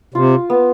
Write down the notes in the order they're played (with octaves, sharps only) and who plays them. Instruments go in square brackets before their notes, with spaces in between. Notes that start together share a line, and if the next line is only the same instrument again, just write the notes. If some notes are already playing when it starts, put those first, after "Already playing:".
[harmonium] C3 [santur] F4
[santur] B3